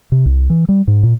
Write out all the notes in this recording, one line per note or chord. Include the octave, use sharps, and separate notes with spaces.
C3
C2
E3
G3
G#2
A#2